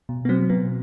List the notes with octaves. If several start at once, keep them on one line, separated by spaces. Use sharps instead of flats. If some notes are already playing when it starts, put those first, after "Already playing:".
B2
B3
F#3 C4
B2 B3